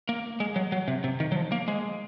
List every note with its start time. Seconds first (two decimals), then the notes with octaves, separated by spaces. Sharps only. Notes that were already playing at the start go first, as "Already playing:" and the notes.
0.09 A#3
0.40 G#3
0.56 F#3
0.72 F#3
0.88 C3
1.04 C3
1.20 D#3
1.32 F#3
1.36 F3
1.52 A#3
1.68 G#3